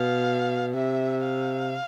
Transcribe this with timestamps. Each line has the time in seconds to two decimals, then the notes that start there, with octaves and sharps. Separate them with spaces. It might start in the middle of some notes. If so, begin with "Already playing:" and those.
Already playing: B2 F5
0.75 C3 E5
1.24 F5